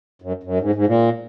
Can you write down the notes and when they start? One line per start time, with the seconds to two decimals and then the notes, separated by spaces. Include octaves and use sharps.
0.22 F#2
0.43 F#2
0.60 G#2
0.75 G#2
0.86 A#2